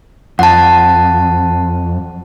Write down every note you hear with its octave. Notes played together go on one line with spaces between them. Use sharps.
F2 F#5 A5